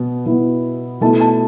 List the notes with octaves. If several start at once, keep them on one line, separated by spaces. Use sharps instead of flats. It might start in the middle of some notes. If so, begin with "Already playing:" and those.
Already playing: B2 B3
B2 B3 E4
B2 A3 E4 A5
A5